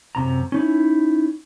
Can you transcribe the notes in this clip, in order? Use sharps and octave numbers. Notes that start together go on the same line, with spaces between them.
F#2 C3 A#5
C#4 D#4 E4